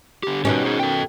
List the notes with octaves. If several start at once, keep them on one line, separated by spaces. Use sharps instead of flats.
D3 G4
B2 D#3 C#4 G4 A#4 B4
G#4 C5
A4 G5